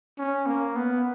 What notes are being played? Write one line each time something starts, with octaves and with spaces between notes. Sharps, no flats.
C#4
A#3
B3